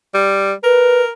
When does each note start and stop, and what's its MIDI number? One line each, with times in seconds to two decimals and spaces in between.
0.14 0.52 55
0.64 1.11 70
0.64 1.02 71